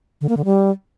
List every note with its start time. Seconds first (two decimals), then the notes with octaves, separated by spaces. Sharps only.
0.21 D3
0.29 A#3
0.37 D3
0.45 G3